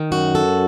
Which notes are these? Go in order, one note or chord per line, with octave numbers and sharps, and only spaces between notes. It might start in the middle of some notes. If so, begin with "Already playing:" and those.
Already playing: D#3
F#2 F#4
A4